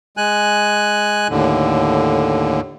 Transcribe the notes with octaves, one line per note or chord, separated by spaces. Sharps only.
G#3 G#5 F#6
D#2 A2 D3